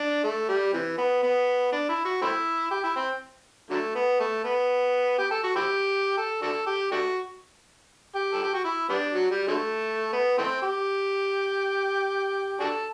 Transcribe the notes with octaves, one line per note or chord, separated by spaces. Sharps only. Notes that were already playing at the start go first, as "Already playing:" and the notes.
Already playing: D4
A3
G3
C3 E3
B3
B3
D4
E4
F#4
A3 C4 E4
G4
E4
C4
D3 F#3 A3
B3
A3
B3
G4
A4
F#4
C4 E4 G4
A4
D4 F#4 A4
G4
A3 D4 F#4
G4
A4
G4
F#4
E4
G3 B3 D4
F#3
G3
D3 F#3 A3
B3
E3 A3 C4
G4
D4 F#4 A4